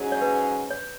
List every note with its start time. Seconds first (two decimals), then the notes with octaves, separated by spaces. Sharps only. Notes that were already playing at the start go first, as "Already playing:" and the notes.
Already playing: G#2 F#3 C#4 G#4
0.12 C#5
0.22 B4
0.70 C#5